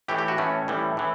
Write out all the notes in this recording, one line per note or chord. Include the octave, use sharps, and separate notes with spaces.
A2 E3 A3 G4
G4
F#4
A2 E3 A3 C#4
A2 E3 G3
A2 E3